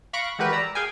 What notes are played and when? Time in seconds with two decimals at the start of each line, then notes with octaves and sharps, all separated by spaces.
0.13 F5 B5 C#6 F#6 A#6 D7
0.39 E3 G#3 F#4 G4 A#4 B4
0.52 D5 A#5 E6
0.75 G#4 F5 G5 G#5